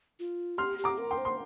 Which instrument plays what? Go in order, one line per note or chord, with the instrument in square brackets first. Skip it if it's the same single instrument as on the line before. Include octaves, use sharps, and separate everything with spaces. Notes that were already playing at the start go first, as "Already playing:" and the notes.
[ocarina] F4
[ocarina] G4 [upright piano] C6 F6
[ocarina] G4
[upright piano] A#5 D6
[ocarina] A#4
[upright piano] G5 C6
[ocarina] C5
[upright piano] C6